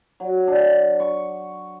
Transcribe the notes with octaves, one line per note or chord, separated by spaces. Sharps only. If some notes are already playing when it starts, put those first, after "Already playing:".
F#3
D4
C#6